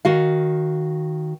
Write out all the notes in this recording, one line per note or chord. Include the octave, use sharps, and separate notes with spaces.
D#3 F#4 F5